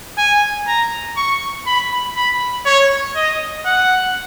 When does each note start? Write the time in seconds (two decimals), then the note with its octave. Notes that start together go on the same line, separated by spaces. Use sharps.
0.18 G#5
0.68 A#5
1.17 C#6
1.67 B5
2.17 B5
2.66 C#5
3.16 D#5
3.66 F#5